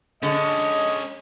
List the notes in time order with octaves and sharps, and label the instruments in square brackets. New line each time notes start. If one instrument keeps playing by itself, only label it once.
[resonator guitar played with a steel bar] D3 G#3 [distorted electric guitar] C#4 D#4 [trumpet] D#5